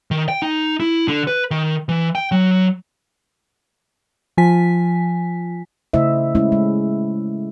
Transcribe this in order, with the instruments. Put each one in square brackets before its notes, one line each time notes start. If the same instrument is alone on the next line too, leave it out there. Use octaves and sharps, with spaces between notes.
[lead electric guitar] D#3
G5
D#4
E4
D3
B4
D#3
E3
G5
F#3
[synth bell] F3 F4 G#5 B6
[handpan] C#3 A3 E4 C5 D#5 E5
G#3 A3 C#4 E4
G#3